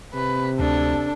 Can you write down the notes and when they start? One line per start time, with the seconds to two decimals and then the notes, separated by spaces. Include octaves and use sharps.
0.14 C3 B4
0.59 D2 D4 A4